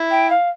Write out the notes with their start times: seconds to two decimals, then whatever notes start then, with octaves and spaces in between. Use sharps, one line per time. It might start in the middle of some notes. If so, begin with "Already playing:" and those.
Already playing: E4
0.11 G5
0.30 F5